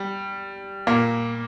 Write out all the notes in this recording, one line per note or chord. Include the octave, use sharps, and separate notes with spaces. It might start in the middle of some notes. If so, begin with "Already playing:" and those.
Already playing: G3
A#2 A#3